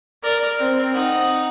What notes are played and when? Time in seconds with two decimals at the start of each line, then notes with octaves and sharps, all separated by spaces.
0.23 A#4 D5
0.58 C4
0.93 D#4 F#5